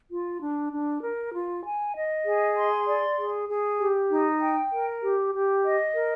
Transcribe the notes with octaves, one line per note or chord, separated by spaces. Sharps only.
F4
D4
D4
A#4
F4
G#5
D#5
G#4
C6
D5
G#4
G#4
G4
D#4
G5
A#4
G4
G4
D#5
A#4